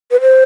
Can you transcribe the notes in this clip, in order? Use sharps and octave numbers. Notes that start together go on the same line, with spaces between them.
B4
C5